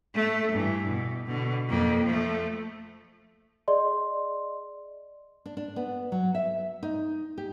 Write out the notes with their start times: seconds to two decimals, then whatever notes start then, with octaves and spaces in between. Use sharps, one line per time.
0.15 A3
0.52 G2 E3
0.87 B2
1.26 B2 D3
1.69 F2 A#3
2.06 F3 A3
3.68 G#4 D5 D#5 C6
5.46 D4
5.57 D4
5.76 B3
6.12 F#3
6.35 E5
6.83 D#4
7.38 G4